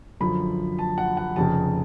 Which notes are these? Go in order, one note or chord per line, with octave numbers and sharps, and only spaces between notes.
F#2 D3 F3 B5
A5
F#5
F#5
F1 F2 C#3 A5